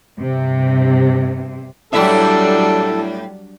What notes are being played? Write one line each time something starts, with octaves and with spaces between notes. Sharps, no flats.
G2 C3
A2 F#3 G3 D4 E4 A4 E5 A5